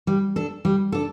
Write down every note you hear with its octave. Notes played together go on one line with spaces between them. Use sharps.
G3
D4 A4
G3
D4 A4